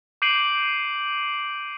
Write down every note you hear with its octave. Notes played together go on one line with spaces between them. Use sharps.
D6 G6 C7 D7 D#7 F#7